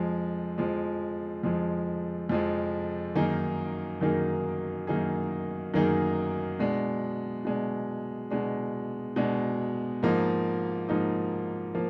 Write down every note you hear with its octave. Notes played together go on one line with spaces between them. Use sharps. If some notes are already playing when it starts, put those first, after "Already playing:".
Already playing: F2 F3 G#3
F2 F3 G#3
F2 F3 G#3
F2 F3 G#3
F#2 D#3 A#3 D#4 G#4
F#2 D#3 A#3 D#4 G#4
F#2 D#3 A#3 D#4 G#4
F#2 D#3 A#3 D#4 G#4
B2 G#3 D4
B2 G#3 D4
B2 G#3 D4
B2 G#3 D4
G#2 F3 A#3 D#4
G#2 F3 A#3 D#4
F3 A#3